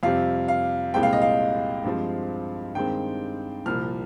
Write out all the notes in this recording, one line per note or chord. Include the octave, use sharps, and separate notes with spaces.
F2 C3 G3 C4 F5
F5
C2 A#2 G#3 C4 G5
F5
D#5
F5
G2 F3 G#3 C4
G2 D#3 G#3 C4 G5
C2 A#2 F3 F6